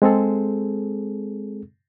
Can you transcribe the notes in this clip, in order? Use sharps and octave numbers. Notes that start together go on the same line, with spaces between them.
G#3 C4 G#4 A4